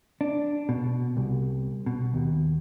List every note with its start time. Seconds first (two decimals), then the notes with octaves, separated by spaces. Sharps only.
0.21 D4
0.69 B2
1.17 C2
1.86 B2
2.14 D#2